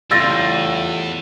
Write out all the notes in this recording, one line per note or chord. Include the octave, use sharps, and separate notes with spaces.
E2 A2 C#3 G3 F4 E6 A6 A#6